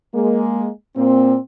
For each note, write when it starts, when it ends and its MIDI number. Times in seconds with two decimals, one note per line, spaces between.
0.15 0.69 56
0.15 0.69 58
0.96 1.38 46
0.96 1.38 58
0.96 1.38 60